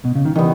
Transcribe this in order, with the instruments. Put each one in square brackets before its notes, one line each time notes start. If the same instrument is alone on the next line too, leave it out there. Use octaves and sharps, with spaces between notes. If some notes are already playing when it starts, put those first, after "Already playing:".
[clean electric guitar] B2
C#3
D#3
[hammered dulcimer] D#3 G3 B3 [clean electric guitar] E3